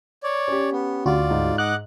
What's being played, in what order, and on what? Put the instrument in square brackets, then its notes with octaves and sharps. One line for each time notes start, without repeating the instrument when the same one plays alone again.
[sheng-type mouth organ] C#5 D5
[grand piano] C#4 G4
[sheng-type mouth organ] B3
[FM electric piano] D2 F#4 [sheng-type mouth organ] F4 D5
[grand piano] G#2
[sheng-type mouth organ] D#5 F#5 D6 [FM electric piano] F#6